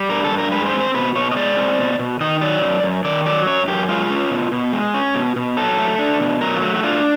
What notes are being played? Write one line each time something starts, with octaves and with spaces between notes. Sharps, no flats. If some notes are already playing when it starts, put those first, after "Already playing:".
Already playing: G3
G2 A#4
A4
G2
A#4
G#3 B4
C5
C4
C5
B2 B4
B2 C#5
D#5
G#3 D5
C4
B2
B2
D#3 D#5
F#3 D5
F#2
F#2
D#3 D5
F#3 D5
F#2 C#5
F#2 G4
G#3 F4
C#4
B2
B2
G#3
C#4
B2
B2
F#3 A4
A3
D4
B2
F#3 A#4
F4
A3 F#4
F#4
D4 F4